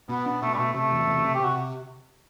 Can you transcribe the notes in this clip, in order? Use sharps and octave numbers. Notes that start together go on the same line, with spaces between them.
B2 B3
B3 D4
B2 A3
G3
B2 A3
C3 A3
E2
C3
C3
G4
C3 F#4